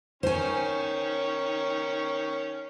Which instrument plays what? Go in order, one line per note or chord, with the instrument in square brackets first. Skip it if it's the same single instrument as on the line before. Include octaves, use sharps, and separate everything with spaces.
[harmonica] D#3 C#4 C#6 [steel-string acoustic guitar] C5 G#5